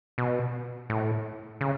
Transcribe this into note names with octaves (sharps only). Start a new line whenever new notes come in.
B2
A2
C#3